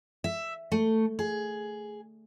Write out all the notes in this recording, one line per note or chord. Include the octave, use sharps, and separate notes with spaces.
E5
A3
G#4